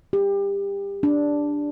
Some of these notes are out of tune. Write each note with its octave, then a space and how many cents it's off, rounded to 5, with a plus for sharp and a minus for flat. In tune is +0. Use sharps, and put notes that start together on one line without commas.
G4 +25
D4 -5